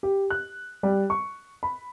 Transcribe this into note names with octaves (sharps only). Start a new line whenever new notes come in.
G4
F#6
G3
C#6
B5